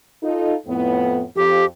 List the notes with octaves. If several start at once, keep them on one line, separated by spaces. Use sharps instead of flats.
D#4 F4 A4
F2 A2 B3
F2 G4